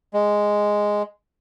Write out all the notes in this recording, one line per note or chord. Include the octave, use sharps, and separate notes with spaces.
G#3